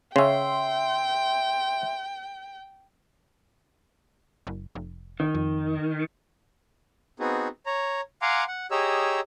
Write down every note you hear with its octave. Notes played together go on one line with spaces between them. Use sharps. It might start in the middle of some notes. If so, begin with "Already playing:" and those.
C#3 C#4 E5 G5 C6
F#1
F1
D#3
F2
B3 C4 D#4 F#4 G#4
C#5 A#5
F5 F#5 G#5 A#5 C6 D6
F#5
G4 G#4 C#5 D#5 A#5 E6